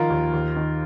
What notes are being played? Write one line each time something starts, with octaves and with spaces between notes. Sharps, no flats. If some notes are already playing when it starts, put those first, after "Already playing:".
Already playing: D#3 F3 F4 A#4
D#2
D#2
D#3